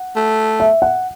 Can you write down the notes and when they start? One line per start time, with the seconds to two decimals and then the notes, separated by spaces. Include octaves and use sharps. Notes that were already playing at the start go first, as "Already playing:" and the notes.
Already playing: F#5
0.16 A3
0.60 E5
0.82 F#5